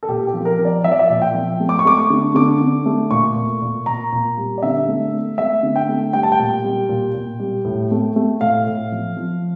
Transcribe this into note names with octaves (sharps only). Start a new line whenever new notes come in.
A4
A#2 G4
G4
F3
A#4
F3
D5
F3 E5
D5
E5
A#2
G5
F3
A3
D6
C#6
A3 D6
C#6
D3
D3 D6
D3
A3
A#2 C#6
A#2
A#2
A#2 A#5
A#2
G3
D5
D3 E5
A3
A3
A3 E5
D3
G5
A3
G3 G5
A5
G5
A#2
G3
A#2
A#2
G3
A2
A3
A3
A2 F5
A2
F3
F3